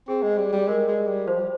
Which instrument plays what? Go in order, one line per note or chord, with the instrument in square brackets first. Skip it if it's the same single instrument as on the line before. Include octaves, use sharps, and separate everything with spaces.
[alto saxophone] C4 [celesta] G#4
[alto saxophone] G#3
G3
G3
[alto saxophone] G#3 [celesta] A#4
[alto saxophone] G#3
G3
[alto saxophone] F3 [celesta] C5
[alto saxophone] G3